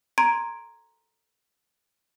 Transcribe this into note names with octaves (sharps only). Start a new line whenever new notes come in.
A#5 C6 G#6 D7 D#7